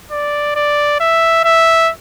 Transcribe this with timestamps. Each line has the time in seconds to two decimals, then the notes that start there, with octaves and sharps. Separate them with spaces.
0.11 D5
0.56 D5
1.00 E5
1.44 E5